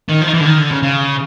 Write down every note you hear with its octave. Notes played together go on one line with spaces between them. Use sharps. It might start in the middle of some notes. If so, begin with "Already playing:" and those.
D#3
F3
D#3
E3
D3
D#3
D3
C#3
C#3